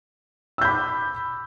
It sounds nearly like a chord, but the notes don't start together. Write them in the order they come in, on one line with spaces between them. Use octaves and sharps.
E6 G6 B5 D6